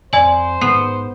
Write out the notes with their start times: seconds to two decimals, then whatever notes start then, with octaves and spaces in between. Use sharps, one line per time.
0.13 F2 C5 D5 G#5 F#7
0.61 G#2 B3 C7